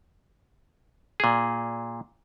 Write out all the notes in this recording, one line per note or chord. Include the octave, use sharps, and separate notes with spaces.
A#2 G#4